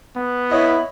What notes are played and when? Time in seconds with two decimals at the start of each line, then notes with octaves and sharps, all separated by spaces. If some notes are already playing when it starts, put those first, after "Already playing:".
0.16 B3
0.51 E4 C#5 D#5 E5